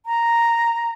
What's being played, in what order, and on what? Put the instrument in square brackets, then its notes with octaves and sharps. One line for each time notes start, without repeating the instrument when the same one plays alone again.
[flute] A#5